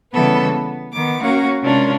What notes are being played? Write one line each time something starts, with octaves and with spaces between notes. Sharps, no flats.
C#3 E3 G3 B3 A4 B4
B3
D#3 B3 D6
A#3 C#4 F#4 A#4 F5 F#5
C3 G#3 C#4 D4 F4 A#4